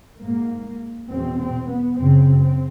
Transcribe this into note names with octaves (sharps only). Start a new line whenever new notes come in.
G#2 A#3
E2 B2 C4
C4
B3
F#2 C#3 C4
C4